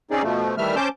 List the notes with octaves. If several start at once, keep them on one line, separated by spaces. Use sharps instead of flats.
C4 C#4 D#4 G#4 D5
B2 F3 A3
D#3 E3 G3 A3 E5 F6
C#4 C5 A5 D6 G6